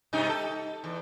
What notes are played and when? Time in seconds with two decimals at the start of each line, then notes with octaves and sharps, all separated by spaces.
0.13 G2 C3 D#4
0.29 A4
0.84 E2